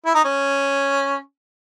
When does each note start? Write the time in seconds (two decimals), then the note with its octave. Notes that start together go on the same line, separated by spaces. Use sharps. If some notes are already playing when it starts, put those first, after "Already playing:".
0.05 E4
0.15 D#4
0.24 C#4